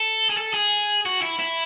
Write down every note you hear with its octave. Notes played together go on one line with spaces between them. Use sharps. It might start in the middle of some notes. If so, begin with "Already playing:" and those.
Already playing: A4
G#4
A4
G#4
F#4
E4
E4